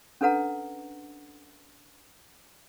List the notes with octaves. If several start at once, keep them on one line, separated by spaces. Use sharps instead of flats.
C#4 D4 A4 B4 F#5 A#5